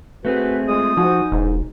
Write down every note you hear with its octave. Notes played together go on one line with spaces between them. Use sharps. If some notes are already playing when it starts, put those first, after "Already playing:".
A3 C4 F#4 G#4 B4
G#3 F4 C5 D#6
F3 D#4 F#4 G#5
E1 G#2